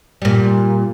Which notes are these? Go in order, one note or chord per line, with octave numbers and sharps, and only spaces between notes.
A#2 G3